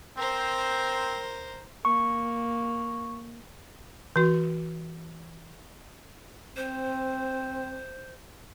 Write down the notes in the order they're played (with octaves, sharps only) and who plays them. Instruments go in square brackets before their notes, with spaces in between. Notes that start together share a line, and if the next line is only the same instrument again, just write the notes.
[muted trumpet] C4 [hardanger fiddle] A#4 C5
[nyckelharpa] A#3 [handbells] C#6
[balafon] E3 F#4
[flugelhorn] C4 [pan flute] C5